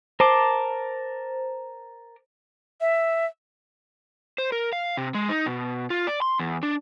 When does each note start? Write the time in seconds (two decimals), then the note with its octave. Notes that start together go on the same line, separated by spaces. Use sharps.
0.20 A#4 C5 A5 D6
2.81 E5
4.38 C5
4.52 A#4
4.73 F5
4.97 C3
5.14 G#3
5.29 D#4
5.46 B2
5.90 F4
6.07 D5
6.22 C6
6.39 E2
6.63 D4